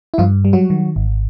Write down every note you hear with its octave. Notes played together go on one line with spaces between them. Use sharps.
E4
G2 F3 F4
G3
F#3 F#4
D#3
G#1